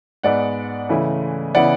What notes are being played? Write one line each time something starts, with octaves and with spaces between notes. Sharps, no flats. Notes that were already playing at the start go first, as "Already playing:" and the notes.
G#2 G#3 B3 D5 F#5
C#3 E3 A3 E4
C#3 E3 B3 E4 D5 F#5